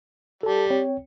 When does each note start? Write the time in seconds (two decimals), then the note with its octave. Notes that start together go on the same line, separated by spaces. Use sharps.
0.43 G3 A4 A5
0.70 C4 C#5 G5